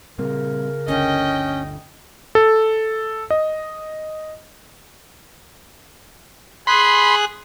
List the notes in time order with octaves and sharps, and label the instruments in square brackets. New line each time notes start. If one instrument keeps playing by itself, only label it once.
[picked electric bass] A#2 G3 C4 [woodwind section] C#3 A#4
[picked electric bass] G1 D2 D3 [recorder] C#4 [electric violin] D#5 G5
[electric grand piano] A4
D#5
[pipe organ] G#4 F#6 [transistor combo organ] B5 C6